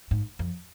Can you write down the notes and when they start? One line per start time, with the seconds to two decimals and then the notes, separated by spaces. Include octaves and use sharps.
0.11 G#2
0.39 F2